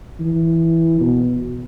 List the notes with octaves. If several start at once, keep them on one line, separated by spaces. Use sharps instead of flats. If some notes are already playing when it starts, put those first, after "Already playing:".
E3
B2